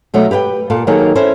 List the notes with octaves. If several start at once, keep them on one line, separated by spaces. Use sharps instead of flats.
B2 F#3 A3 D#4
G4 B4 F#5 G5
A#2 A4 F5
D#3 F#3 A#3 D#4 G#4 A4
C#4 E4 A4 C5